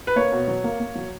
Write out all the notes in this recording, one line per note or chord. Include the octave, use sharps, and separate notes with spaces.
B4
A#3 C#5
B2
F#3
A#3
A#3
F#3